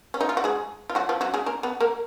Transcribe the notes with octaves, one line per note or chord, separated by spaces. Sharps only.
C#4
D#4
F4
F#4
G#3 G#4
F4
F#3 F#4
F3 F4
F#3 F#4
G#3 G#4
A#3 A#4
B3 B4
A#3 A#4